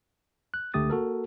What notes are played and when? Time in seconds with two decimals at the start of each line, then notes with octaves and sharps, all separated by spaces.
0.54 F#6
0.74 C#2 D3 A3 G4 D#6 A6
0.90 A#3 F#4 A4 A#4